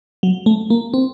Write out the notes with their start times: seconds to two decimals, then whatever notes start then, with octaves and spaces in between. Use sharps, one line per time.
0.23 F#3
0.46 A3
0.70 A#3
0.94 C4